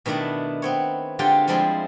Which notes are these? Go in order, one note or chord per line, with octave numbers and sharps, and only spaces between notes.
B2 D#3 A3 D4 E4
B3 C4 C#5
D3 G#3 F4 G4 A4 G5
F3 G3 G#3 C4 E4